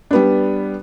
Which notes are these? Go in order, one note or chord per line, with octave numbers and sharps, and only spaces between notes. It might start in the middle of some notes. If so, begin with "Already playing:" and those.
G3 B3 D4